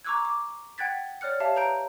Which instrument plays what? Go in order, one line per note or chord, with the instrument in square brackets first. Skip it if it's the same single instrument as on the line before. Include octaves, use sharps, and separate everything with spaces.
[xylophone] A#5 C#6 D6 E6 F#6 G#6
D6
F#5 G5 F#6 G#6 A6 B6
C#5 D5 F6 F#6 C#7
G4 C#5 E5 F5 A5
B4 A#5 G6 D7